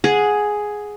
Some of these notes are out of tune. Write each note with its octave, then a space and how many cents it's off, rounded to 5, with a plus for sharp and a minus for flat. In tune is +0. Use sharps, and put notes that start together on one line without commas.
G#4 +5 F#5 -15